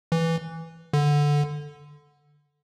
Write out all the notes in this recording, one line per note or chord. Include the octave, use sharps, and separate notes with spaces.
E3
D3